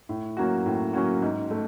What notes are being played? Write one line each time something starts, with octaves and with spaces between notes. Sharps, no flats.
A2
F#3 A#3 C#4 F#4
A2
F#3 A#3 C#4 F#4
G#2
A3